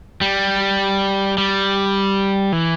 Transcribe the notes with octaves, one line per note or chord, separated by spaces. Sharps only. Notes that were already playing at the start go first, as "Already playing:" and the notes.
G3
G3
E3